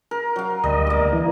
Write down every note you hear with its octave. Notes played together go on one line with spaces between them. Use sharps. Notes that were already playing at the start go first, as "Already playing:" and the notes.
A#4
F#3 F5
D2 G3 D#5
A#3 D6
E3